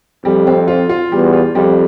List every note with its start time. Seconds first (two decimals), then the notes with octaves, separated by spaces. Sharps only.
0.25 F2 G3
0.47 C4
0.68 F4
0.89 F4
1.12 E2 G3
1.33 F4
1.55 F2 G3